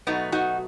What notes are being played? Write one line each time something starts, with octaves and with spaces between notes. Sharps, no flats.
B2 F#3 A3 B3 D#4
D#4 F#4